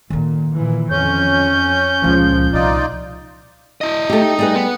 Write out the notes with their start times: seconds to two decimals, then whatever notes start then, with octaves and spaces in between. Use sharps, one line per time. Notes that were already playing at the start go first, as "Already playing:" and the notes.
0.10 A#2 D3 D#3
0.53 A#2 E3
0.90 F2 C#4 G6
2.04 C#2 A#2 F3
2.53 C2 D#4 F4 D5
3.81 E4 D#5
4.10 A3 G4
4.22 D#4
4.39 G3 G#4 B4
4.55 B3